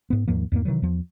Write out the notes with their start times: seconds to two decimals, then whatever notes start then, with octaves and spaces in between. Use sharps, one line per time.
0.10 G#2 B3
0.28 D#2 G#2 F3 A#3
0.52 E2 G#2 F#3 A#3
0.65 C3 D#3 E3 F#3
0.82 E2 F3